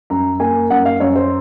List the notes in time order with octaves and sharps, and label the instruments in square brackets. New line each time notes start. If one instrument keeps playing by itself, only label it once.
[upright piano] F#2 A#5
A#3 G#5
F#2 F#5
F5
F#2 C#5
C5